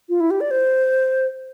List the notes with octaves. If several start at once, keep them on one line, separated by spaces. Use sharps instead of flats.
F4
E4
G4
D5
C5